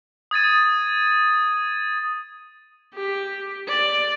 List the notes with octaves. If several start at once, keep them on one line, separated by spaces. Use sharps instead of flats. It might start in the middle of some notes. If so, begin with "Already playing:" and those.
D#6 G#6 A6 D#7
G4
D5